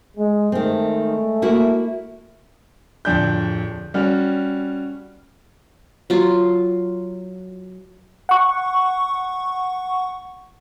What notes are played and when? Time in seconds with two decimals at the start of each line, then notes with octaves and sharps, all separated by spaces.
0.17 G#3
0.52 D#3 G#3 A3 C4
1.42 A#3 E4 F#4
3.05 D1 F2 D4 G6
3.94 G3 C#4 F#4 F6
6.10 F#3 F4
8.29 F#5 C#6